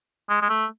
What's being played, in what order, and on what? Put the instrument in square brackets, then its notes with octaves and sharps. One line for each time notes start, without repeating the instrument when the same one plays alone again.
[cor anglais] G#3
G#3
A3